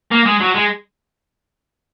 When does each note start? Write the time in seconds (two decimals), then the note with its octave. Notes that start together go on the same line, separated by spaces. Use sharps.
0.11 A#3
0.25 G#3
0.40 F#3
0.55 G#3